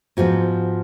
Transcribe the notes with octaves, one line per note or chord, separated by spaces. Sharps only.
G#2 F3 B3 F#4